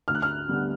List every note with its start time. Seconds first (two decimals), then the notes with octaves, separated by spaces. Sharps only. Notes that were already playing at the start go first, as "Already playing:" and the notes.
0.08 D2 F6
0.15 F#6
0.22 F6
0.48 D3 G3 B3